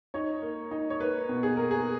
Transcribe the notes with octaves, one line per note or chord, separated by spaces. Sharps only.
D#4 C#5
A#3
D#4
C#5
A#3 B4
B2
G#4
A#3 A#4
G#4